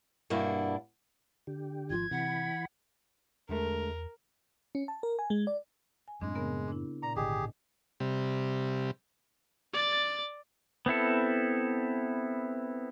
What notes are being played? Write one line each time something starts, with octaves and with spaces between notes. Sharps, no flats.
G2 B2 A#3 B3 D4 E4
D3 G4
G#1 F3 F4 G#6
C3 E3 F#5 B5
E2 D3 G#3 A3 A#4
C#4
A5
A#4
G#5
G#3
D5
G#5
F#2 A2 G#3 C4 D4 G#4
C#3 B3 A#4
D4 E4
A#2 D5 A#5
G#1 G#2 D3 G4 G#4 D#5
C3 G3
D5 A6
B3 C4 E4 A4